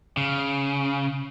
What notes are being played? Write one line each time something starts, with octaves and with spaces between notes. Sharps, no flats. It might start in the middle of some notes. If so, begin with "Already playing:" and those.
C#3